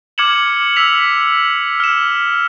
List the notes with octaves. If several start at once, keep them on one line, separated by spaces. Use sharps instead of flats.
D6 F6 G#6 C#7 E7 F#7
E6 B6 F7
F6 E7